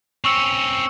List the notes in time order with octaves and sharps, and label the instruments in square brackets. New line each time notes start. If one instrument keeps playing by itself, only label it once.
[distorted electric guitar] C4 C#4 [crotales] C#6 E6 C#7